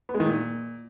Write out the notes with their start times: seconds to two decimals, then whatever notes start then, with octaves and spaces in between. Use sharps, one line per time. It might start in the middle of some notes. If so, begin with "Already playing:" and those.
0.09 B3
0.14 G#3
0.20 D#3
0.25 A#2